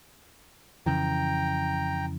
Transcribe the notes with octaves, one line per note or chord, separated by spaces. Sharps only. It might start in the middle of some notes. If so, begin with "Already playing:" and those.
F2 C#3 E3 G5 A#5